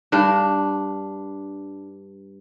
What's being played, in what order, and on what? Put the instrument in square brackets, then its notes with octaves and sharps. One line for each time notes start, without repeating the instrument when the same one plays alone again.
[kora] G2 D4